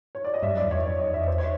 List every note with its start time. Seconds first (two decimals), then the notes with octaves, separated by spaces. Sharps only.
0.15 C#5
0.25 D5
0.34 D#5
0.43 G2 E5
0.53 F#2 D5
0.64 E2
0.71 C#5
0.75 F2
0.86 F#2 C#5
0.99 D#5
1.07 E2
1.14 F2 E5
1.21 E2
1.28 C5
1.38 C#5